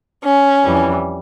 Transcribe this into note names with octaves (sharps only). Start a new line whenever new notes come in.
C#4
F2 E3 G3